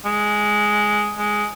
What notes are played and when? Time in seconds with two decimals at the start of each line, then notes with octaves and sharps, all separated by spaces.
0.05 G#3
1.18 G#3